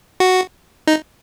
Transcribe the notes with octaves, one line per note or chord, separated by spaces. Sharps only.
F#4
D#4